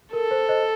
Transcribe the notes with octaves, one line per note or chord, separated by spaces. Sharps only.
A4 A#4
C5
C5 D#5